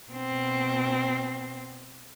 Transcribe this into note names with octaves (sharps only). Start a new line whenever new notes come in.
B2 C4